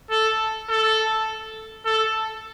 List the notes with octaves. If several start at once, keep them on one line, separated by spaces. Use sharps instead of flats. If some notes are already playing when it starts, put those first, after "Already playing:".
A4
A4
A4